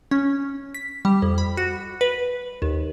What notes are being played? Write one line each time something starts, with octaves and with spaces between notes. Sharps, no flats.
C#4
B6
G3
F2
B5
F#4
B4
D#2